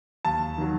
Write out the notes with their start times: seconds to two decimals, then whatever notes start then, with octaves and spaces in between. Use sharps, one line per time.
0.25 D#2 A5
0.58 D#3 F#3